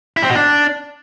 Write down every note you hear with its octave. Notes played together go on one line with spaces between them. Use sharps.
E4
C4
B2
D4